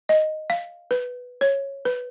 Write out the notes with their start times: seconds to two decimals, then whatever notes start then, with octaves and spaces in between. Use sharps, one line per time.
0.09 D#5
0.50 F5
0.91 B4
1.41 C#5
1.85 B4